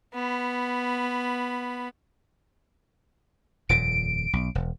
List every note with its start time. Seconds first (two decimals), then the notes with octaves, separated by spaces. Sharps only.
0.14 B3 B5
3.69 D#1 F2 A#2 D7
4.33 B1
4.55 E1